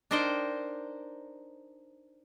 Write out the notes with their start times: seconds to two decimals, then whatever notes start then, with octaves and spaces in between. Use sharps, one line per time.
0.11 D4 D#4 A#4 C5 D#5 G5